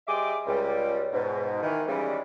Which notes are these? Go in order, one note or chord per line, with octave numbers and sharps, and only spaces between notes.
G3 G#4 D#5 E5 C6 D6
C#2 G3
G#2 B2
D#3 E3
C#3 E3 G3 G#3